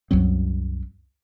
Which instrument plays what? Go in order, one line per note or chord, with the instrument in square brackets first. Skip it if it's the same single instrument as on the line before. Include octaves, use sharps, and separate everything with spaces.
[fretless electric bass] C2 F#2 F#3 C4